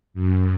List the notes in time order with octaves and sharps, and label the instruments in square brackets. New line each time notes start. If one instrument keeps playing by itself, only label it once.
[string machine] F#2